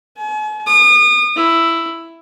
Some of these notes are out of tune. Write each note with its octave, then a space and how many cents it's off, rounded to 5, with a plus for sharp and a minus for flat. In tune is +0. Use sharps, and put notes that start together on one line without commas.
G#5 +45
D#6 -35
E4 +5